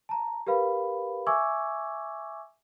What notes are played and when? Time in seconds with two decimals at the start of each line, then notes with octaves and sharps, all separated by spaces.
0.09 A5 A#5
0.47 G4 A#4 B4 F5 B5
1.27 E5 G#5 C#6 D6 E6 G#6